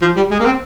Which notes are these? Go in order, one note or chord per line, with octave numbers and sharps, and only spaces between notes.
F3
G3
G#3
A#3
C4